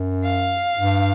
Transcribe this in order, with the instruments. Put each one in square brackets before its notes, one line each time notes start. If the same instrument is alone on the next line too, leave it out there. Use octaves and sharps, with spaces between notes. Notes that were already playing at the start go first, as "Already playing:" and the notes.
Already playing: [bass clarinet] F#2
[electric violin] F5
[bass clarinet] G2